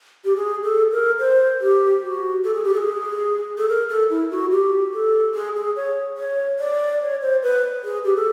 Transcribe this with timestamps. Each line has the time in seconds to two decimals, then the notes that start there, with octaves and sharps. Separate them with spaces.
0.25 G4
0.36 G#4
0.64 A4
0.92 A#4
1.19 C5
1.61 G4
2.03 F#4
2.44 A4
2.54 G#4
2.64 G4
2.73 A4
2.77 G#4
3.58 A4
3.69 A#4
3.89 A4
4.10 E4
4.31 F#4
4.52 G4
4.93 A4
5.34 G#4
5.56 G#4
5.76 C#5
6.18 C#5
6.59 D5
7.01 C#5
7.22 C5
7.43 B4
7.84 G#4
8.04 G4
8.16 A4